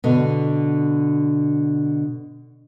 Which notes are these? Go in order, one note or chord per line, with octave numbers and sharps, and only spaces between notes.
B2 D3